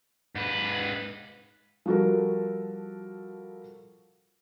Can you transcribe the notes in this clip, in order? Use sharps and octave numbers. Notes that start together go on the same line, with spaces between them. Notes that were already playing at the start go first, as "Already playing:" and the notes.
G#2 B4
F3 G3 F#4 A4 A#4